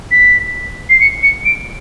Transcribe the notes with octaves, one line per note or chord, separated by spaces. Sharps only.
B6
C7
C#7
C#7
D7